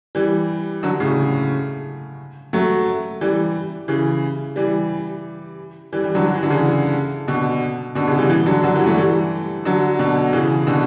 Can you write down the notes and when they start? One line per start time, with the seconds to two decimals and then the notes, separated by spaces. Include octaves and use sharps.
0.15 E3 G3
0.83 D3 F#3
1.00 A2 C#3
2.53 F#3 A3
3.21 E3 G3
3.88 C#3 E3
4.56 E3 G3
5.93 E3 G3
6.04 E3 G3
6.15 D3 F#3
6.26 F#3
6.35 E3
6.43 D3
6.50 C#3 E3
7.28 B2 D3
7.95 B2 D3
8.07 C#3 E3
8.19 E3 G3
8.30 E3 G3
8.46 D3 F#3
8.64 D3 F#3
8.75 E3 G3
8.86 F#3 A3
8.97 E3 G3
9.65 D3 F#3
9.99 B2 D3
10.33 C#3 E3
10.67 B2 D3